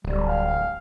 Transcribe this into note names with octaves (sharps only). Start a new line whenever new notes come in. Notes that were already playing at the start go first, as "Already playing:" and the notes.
D1 G3
F5